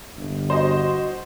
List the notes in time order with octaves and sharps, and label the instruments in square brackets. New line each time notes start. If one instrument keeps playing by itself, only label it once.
[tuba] G1
[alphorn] F#4 [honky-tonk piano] C5 D#5